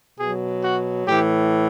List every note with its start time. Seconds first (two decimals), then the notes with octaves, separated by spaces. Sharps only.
0.18 B2 F#3 G#4
0.62 F#4
1.06 A2 E3 G4